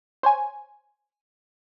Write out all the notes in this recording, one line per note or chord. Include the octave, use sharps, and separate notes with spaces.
C5 C#5 G#5